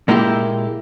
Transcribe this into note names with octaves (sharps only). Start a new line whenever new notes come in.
A#2 G#3 A#3 E4 F#4 G4